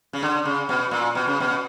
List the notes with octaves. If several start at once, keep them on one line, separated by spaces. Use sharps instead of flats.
C#3
D3
C#3
B2
A#2
B2
C#3
B2